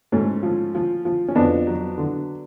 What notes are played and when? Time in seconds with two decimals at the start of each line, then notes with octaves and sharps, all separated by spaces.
0.12 G#2 A3 C#4
0.43 F3
0.75 F3
1.05 F3
1.28 C#4
1.35 F2 B3 D4
1.67 F#3
1.98 D3